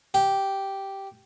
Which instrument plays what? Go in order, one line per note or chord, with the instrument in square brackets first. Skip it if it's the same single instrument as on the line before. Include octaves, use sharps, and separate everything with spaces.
[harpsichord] G4